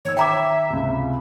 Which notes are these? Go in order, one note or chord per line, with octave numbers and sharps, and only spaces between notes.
D#3 C#5 E6
E5 G5 A#5 D6
C#2 C3